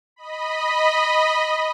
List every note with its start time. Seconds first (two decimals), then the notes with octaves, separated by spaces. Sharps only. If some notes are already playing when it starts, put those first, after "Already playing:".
0.16 D#5 B5